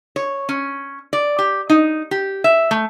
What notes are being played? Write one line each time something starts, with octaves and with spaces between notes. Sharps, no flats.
C#5
C#4
D5
G4
D#4
G4
E5
A3